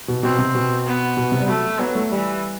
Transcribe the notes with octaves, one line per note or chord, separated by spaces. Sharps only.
B2
B2 C4
C3
B2
B3
B2
C3
G3
F#3 A3
F#3 B3
A3
E3 G3